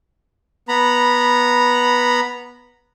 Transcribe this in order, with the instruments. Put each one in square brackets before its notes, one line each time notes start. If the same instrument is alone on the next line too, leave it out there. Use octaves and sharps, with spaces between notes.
[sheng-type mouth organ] B3 A#5 B5